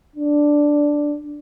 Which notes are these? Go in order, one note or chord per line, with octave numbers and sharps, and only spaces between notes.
D4